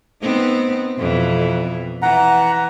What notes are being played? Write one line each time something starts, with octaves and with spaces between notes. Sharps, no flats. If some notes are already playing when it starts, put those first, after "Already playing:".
B3 C4 D#4
F2 B2 E3
E3 F#5 A#5